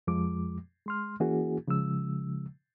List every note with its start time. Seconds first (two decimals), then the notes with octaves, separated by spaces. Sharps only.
0.07 F2 F3 G#3 D6
0.86 G#3 C6 F6
1.20 E3 A#3 C#4 E4 F#4 G#4
1.68 C#3 F3 G#3 E6